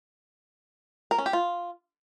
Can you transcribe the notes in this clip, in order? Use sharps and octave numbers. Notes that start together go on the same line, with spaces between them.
A#4
C#4
G4
F4